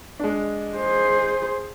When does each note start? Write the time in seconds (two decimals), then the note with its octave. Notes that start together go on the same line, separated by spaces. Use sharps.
0.19 G#3 D4
0.77 G#4 C5